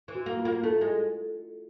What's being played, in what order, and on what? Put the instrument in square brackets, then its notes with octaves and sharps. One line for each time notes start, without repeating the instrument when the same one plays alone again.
[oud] E3
[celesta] F#4
[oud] A#3
[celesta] F4
[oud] A#3
[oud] A3 [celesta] E4
[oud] G#3